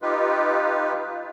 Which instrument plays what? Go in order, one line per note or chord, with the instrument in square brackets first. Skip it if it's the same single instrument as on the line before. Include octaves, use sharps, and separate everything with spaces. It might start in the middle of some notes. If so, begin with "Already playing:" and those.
[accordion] D#4 F4 G4 B4